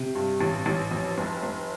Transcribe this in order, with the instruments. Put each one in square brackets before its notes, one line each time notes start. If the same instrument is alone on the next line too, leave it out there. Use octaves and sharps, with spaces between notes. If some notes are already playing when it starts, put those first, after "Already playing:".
Already playing: [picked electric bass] C3
[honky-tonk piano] G2
A1
A1
F2
F1
F1